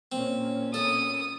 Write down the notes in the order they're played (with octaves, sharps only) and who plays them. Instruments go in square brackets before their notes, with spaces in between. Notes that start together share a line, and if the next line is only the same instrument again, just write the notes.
[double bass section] A#2 A#3 C#4 [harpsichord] C4
[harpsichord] A4 [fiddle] D#6